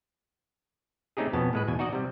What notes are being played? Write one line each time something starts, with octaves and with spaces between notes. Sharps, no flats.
A3 C4 C#4 D#4 G4 G#4
F2 B2 B3 C#4 A5
A2 G#3 B4
E2 B2 G#5
D#4 F#4 D5 D#5
C3 G3